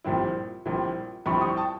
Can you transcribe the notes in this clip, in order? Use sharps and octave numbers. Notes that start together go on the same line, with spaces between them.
A#1 A#2 G3 C4 E4
A#1 A#2 G3 C4 E4
A#1 A#2 G3 C4 E4 B5 C#6
C#6 D#6
G5 A5